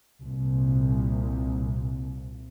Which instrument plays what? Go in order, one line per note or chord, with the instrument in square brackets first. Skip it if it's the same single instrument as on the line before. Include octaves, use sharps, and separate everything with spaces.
[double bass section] C2 A#2